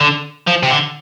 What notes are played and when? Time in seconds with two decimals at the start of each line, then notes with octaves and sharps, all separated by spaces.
0.01 D3
0.48 F3
0.64 C3
0.71 D3